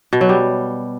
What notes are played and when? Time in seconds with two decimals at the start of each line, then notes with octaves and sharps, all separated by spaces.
0.13 B2
0.21 F#3
0.29 G3